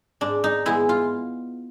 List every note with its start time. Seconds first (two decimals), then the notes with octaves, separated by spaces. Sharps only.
0.21 G#2 D4
0.44 D#4
0.66 E3 G#3 B3 E4
0.89 F4